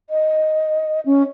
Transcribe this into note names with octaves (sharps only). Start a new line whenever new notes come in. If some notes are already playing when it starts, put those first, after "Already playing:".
D#5
C#4